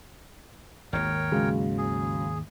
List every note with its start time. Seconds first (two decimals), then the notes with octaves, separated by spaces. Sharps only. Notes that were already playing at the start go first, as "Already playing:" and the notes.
0.93 G#1 D#2 A#4 C#5 G5
1.32 C#3 F#3 G#3
1.78 G#4